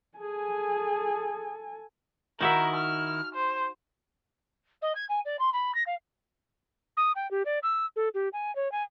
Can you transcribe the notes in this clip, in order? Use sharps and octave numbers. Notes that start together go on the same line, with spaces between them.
G#4 A4 G#5
D#3 D#4 E4 F#4 A#4 E5
F6
C5
D#5
G#6
G#5
D5
C6
B5
A#6
F5
D#6
G5
G4
D5
E6
A4
G4
G#5
C#5
G#5